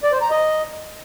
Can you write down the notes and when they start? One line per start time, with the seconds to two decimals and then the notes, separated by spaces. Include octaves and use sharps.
0.03 D5
0.12 C5
0.21 A#5
0.30 D#5